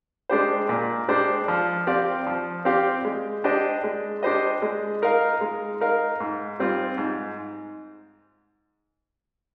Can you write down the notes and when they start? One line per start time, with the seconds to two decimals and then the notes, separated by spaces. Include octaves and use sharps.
0.29 G#3 D4 G4 C5
0.69 A#2
1.08 G#3 D4 G4 C5
1.48 F3
1.87 C4 G4 D5 F5
2.27 F3
2.65 C4 G4 D5 F5
3.05 G#3
3.44 D4 G4 C5 D#5
3.84 G#3
4.23 D4 G4 C5 D#5
4.62 G#3
5.02 D#4 A#4 F5
5.41 G#3
5.81 D#4 A#4 F5
6.20 G#2
6.60 G3 C4 F4
6.98 G#2